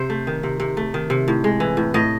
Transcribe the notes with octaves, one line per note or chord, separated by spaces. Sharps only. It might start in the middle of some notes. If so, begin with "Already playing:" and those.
Already playing: C3 C5
A3
D#3
C3
C3
A3
D#3
C3
A2
G#3
E3
A2
A2 D#5